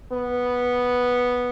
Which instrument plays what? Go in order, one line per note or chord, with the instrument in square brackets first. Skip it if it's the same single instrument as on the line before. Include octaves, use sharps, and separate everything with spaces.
[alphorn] B3